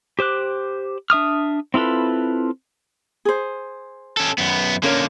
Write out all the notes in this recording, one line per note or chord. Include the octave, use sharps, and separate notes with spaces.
G4 C5 D6 F#6
D4 E5 D#6 F6
C4 E4 F4 A4 B4
G#4 C5
C#4 A4
F#2 B3
D3 A#3 C#4 A#4 C#5